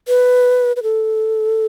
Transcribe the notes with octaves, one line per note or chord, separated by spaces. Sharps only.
B4
B4
A4